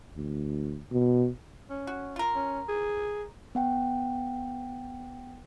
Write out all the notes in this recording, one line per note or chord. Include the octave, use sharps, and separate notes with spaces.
D2
B2
C#4
F#4
F4 A#4
C#4
G#4
B3 F#5 G5